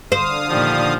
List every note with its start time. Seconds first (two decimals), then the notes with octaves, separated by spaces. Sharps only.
0.12 D3 C5 F5 D#6
0.49 A#2 D#3 F3 G3